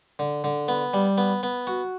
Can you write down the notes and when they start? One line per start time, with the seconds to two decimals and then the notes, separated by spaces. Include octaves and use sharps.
0.19 D3
0.44 D3
0.68 B3
0.94 G3
1.18 B3
1.43 B3
1.67 F#4